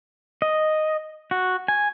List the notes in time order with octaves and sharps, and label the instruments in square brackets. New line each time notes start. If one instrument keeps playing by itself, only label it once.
[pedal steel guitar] D#5
F#4
G#5